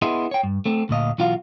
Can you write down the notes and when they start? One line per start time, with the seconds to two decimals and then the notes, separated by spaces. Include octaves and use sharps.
0.02 B3 E4 G#4 D#5 E5 C6
0.31 C#5 G5
0.43 G2
0.66 A3 C4
0.89 D2 A#2 D#5 F5
1.18 B1 E3 F4 F#4 F5